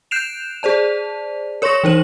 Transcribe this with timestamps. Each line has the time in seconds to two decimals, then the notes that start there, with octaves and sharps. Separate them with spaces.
0.11 F#6 G6 C7 D7 E7 F7
0.63 G#4 C5 D5 A5
1.62 A#4 C#5 C6 C#6 A#6
1.84 E3 D#4 C5 F#7